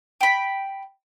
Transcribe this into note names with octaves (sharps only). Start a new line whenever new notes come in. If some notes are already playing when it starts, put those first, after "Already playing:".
G5 B5